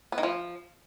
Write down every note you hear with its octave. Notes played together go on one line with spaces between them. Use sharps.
B3
D#3
F3